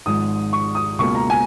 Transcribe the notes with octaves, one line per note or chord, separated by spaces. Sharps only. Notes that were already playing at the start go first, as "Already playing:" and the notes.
G#1 G#2 F3 G#3 D#6
C#6
D#6
C#2 B2 A#3 C#6
A#5
G#5